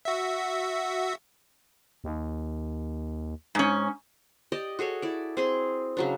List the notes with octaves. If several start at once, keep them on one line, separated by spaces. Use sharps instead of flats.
F#4 E5
D#2
G#2 C#4
G4 D5 D#5
F#4 G#4 A4 C#5
E4 D5
C4 G#4 C6
C#3 F#3 D4